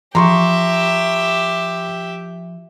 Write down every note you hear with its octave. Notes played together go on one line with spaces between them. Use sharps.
F3 G4 E5 A#5 C6 C#6